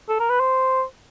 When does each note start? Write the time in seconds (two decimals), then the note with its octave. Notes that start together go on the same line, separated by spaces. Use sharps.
0.09 A4
0.20 A#4
0.30 B4
0.40 C5